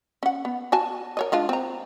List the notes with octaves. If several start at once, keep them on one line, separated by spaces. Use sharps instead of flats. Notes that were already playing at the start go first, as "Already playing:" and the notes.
C#4 F#5
B3
F#4 G#5 A5
A#4 C#5 D#5
G#3 D4 F4
C4 A#5